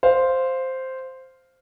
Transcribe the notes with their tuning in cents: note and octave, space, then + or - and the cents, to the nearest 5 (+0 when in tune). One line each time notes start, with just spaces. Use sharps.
C5 +0 F5 +0